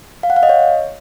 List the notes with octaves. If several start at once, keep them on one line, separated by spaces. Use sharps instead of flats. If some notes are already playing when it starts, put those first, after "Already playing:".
F5
F#5
F5
D#5
C#5